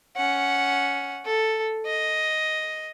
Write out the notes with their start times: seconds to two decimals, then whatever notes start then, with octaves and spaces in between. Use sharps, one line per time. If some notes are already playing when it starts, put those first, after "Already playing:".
0.17 C#4 F#5
1.25 A4
1.86 D#5